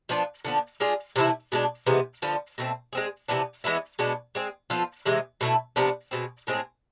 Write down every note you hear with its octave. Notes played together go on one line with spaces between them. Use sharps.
F3 B3 D4 F4
D3 F3 B3 D4
G#3 D4 F4 G#4
C3 E3 A3 E4
B2 G#3 D4
C3 E3 G#3 B3
D3 F3 B3 F4
B2 A3 C4
G#3 C4 G#4
C3 E3 B3 D4
E3 G#3 B3 E4
B2 G#3 B3 D4
G#3 C4 G#4
F3 B3 F4 A4
C3 E3 G#3
B2 A3 E4
C3 F3 B3 D4
B2 G#3 C4
A2 G#3 C4 G#4